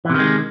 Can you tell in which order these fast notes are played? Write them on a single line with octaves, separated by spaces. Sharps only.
E3 C3 D#3 G#3